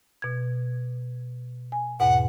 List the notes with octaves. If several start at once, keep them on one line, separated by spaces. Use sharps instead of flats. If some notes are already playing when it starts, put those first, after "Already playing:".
B2 G#6
G#5
E2 G#2 B2 F#5